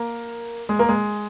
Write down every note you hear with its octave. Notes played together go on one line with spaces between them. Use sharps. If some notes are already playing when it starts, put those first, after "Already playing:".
Already playing: A#3
G#3
A#3
G#3